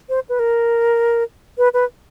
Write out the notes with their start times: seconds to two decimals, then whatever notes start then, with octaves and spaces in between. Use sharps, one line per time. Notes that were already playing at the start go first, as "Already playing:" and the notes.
0.09 C5
0.29 B4
0.39 A#4
1.58 B4
1.74 B4